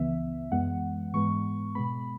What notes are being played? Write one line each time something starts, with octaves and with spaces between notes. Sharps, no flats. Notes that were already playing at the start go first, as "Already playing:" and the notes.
Already playing: C#2 C#3 E3 B3 E5
F#2 E3 G#3 B3 F#5
G#2 E3 G#3 B3 C#6
B2 G#3 B3 B5